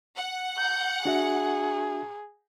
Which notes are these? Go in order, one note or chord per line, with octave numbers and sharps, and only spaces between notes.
F#5
G6
D4 F#4 G#4 E5